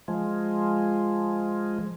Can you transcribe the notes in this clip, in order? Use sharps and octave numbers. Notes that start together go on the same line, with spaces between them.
F3 G#3